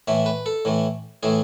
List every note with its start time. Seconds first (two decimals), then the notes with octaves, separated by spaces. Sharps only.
0.07 A2 E3 A3 E5
0.26 B4
0.46 A4
0.65 A2 E3 A3
1.23 A2 E3 A3 G#4